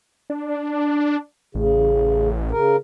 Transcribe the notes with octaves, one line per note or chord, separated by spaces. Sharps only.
D4
A1 C#3
C#3 A#4